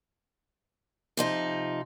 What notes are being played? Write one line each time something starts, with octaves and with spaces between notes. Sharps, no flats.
C3 F3 D#4